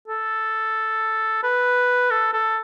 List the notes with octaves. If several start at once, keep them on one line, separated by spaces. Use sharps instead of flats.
A4
B4
A4
A4